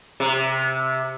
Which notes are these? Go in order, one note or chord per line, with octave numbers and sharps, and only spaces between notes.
C3